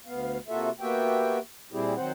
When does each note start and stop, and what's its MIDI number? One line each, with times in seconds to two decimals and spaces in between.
0.06 0.38 38
0.06 0.38 59
0.06 0.38 77
0.48 0.70 48
0.48 0.70 58
0.48 0.70 65
0.48 0.70 66
0.48 0.70 69
0.48 0.70 76
0.80 1.39 58
0.80 1.39 59
0.80 1.39 66
0.80 1.39 67
0.80 1.39 76
0.80 1.39 79
1.72 1.94 46
1.72 1.94 55
1.72 1.94 60
1.72 1.94 64
1.72 1.94 67
1.72 1.94 68
1.96 2.12 51
1.96 2.12 54
1.96 2.12 60
1.96 2.12 72
1.96 2.12 78